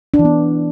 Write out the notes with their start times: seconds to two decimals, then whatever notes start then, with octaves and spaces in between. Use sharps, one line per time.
0.14 D4
0.19 E3
0.25 B3